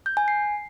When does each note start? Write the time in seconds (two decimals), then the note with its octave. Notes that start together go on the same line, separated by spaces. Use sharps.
0.06 G6
0.17 G#5
0.28 C7